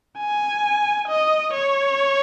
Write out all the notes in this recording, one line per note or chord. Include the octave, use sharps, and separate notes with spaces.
G#5
D#5
C#5